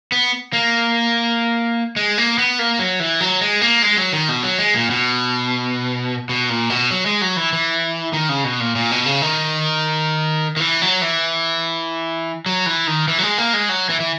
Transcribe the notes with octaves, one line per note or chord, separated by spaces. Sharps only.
B3
A#3
G#3
A#3
B3
A#3
F#3
E3
F#3
G#3
A#3
G#3
F#3
D#3
B2
F#3
G#3
A#2
B2
B2
A#2
B2
F#3
G#3
F#3
E3
E3
D#3
C#3
B2
A#2
A#2
B2
C#3
D#3
D#3
E3
F#3
E3
F#3
E3
D#3
E3
F#3
G#3
A#3
G#3
F#3
E3
E3